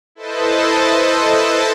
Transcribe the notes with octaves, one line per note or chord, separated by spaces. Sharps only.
E4 A4 B4 C5 D#5 A5